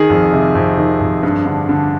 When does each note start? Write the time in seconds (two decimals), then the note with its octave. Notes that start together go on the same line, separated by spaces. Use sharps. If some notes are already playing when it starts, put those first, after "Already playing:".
Already playing: D#3 G#4
0.10 F2
0.33 C3
0.55 F2
0.78 D#3
1.00 F2
1.23 G2
1.46 D3
1.69 D3